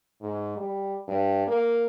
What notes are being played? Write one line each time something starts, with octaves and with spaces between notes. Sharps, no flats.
G#2
G3
G2
A#3